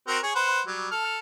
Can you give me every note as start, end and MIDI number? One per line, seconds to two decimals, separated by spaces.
0.08 0.18 60
0.08 0.18 66
0.08 0.18 70
0.23 0.34 68
0.23 0.34 73
0.35 0.61 71
0.35 0.61 72
0.35 0.61 78
0.67 0.89 54
0.67 0.89 55
0.91 1.19 69
0.91 1.19 89